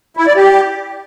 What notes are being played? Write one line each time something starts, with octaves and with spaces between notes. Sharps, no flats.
E4
D5
G4